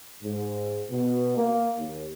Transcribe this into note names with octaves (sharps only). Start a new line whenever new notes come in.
G#2
B2
A#3
D#2